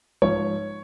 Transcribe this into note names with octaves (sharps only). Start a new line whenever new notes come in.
G#2 F3 C#5